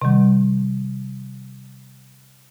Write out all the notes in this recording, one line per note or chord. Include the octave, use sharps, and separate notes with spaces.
C3 D#3 G3